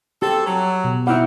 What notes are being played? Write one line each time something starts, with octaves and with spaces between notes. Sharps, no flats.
C4 G4 A4
F#3
B2
D#3 G3 C4 E4 F#5